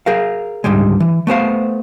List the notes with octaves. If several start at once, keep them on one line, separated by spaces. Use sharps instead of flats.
G#4 A#4 F5
C#2 G#2 D3 G3 G#3
E3
A3 B3 C5 F5